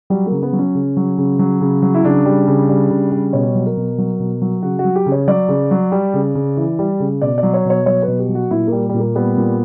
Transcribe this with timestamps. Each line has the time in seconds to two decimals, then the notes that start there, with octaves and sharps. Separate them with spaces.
0.10 F#3 G3
0.26 C#3 A#3
0.42 B3
0.53 F#3
0.59 C#4
0.75 C#3
0.97 F#3
1.18 C#3
1.39 F#3
1.61 C#3
1.82 F#3
1.94 E4
2.04 C#3 D4
2.25 G3
2.48 C#3
2.69 G3
2.90 C#3
3.12 G3
3.33 B2 C#5
3.55 F#3
3.66 A#4
3.77 B2
3.98 F#3
4.19 B2
4.42 F#3
4.62 C#3 F#4
4.79 F#4
4.84 F#3
4.96 G4
5.06 C#3
5.12 C#5
5.27 F#3 D5
5.49 C#3
5.71 F#3
5.92 G3
6.14 C#3
6.35 C#3
6.57 E3
6.79 G3
7.00 C#3
7.22 B2 D5
7.38 D5
7.43 F#3
7.54 C#5
7.65 B2 C#5
7.86 F#3 C#5
8.02 B4
8.08 B2
8.19 G4
8.29 F#3
8.35 F#4
8.51 A#2 E4
8.67 A#3
8.72 G3
8.89 A#2 G3
8.99 A#3
9.15 G3 B3
9.38 A#2